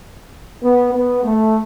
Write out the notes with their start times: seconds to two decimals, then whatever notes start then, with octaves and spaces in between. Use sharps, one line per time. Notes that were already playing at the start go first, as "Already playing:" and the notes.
0.62 B3
0.93 B3
1.23 A3